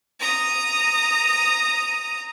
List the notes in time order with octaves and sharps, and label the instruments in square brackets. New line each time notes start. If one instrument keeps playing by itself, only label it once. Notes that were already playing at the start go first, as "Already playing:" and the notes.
[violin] A#5 D#6